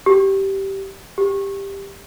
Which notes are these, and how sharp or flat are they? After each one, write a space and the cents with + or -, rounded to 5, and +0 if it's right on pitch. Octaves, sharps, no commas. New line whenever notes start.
G4 -15
G4 +10